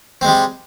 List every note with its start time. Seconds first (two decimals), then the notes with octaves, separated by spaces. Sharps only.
0.21 C4
0.25 G#3
0.28 G3